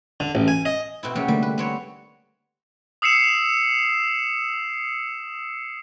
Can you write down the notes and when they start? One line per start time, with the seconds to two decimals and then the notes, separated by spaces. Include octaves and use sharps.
0.20 D3
0.35 A1
0.48 G#5
0.65 D#5
1.03 B2 C4 E4
1.15 C3 F#3 A#3 C#4 G4 G#4
1.28 D3 G3 A3 A#3
1.43 B4
1.58 B3 C4 C#5
3.02 D#6 E6 C7 C#7 E7